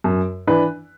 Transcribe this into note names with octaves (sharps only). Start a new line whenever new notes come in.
F#2
E3 D4 B4